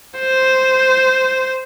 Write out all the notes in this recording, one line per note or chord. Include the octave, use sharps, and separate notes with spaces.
C5